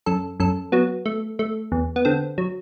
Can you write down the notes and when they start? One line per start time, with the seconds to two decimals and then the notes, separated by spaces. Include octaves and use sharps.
0.06 F#2 A4
0.40 F#2 A4
0.72 F#3 B3
1.06 A3
1.39 A3
1.72 E2
1.96 B3
2.05 D3 C4
2.38 F#3